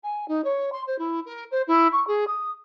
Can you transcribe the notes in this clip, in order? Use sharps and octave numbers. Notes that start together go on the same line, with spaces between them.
G#5
D#4
C#5
C6
C5
E4
A#4
C5
E4
C#6
G#4
D#6